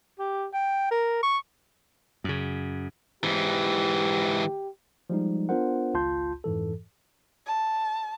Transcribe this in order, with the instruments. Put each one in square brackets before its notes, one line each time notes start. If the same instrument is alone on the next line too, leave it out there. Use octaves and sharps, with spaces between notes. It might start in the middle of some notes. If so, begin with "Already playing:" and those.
[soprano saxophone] G4
G5
A#4
C#6
[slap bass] F#2 C#3
[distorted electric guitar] G#2 E3 [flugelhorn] G4
[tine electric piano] F3 G3 G#3 D#4
B3 D4 F4 A#4 C5 F#5
G#1 C#2 F4 A5 C6 G6
F2 G#2 E3 A4
[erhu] A5